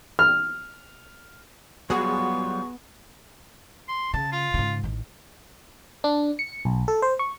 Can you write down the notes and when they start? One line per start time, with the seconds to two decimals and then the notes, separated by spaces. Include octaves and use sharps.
0.19 F6
1.90 F#3 G3 B3 F4 F#4 G#4 C#6
3.89 C6
4.14 C#3 A5
4.32 F4
4.54 G#2 C#3
4.84 A1 D#3
6.04 D4
6.39 C#7
6.65 B1
6.88 A4
7.02 C5
7.19 C#6